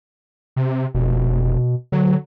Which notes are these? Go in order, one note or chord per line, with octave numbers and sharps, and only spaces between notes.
C3
F1 B2
D3 F#3